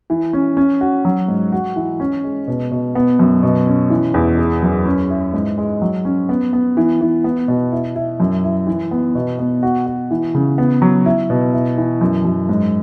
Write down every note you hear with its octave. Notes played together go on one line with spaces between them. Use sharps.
E3
C#4
C#4
F#4
F#3
G#2
F#4
E3
C#4
G#3
B2
B2
B3
F#2
B2
C#4
E3
E2
G#4
F#2
C#4
E4
G#2
G#3
F#3
C#4
B3
B3
E3
E3
B3
B2
E4
E4
F#2
E4
E3
B3
B2
B3
F#4
F#4
E3
C#3
B3
F#3
E4
B2
E4
E3
F#2
F#2
G#2